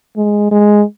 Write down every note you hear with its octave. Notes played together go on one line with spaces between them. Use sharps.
G#3
G#3